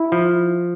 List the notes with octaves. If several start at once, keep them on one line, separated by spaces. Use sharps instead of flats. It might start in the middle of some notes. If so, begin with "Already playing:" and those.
Already playing: E4
F3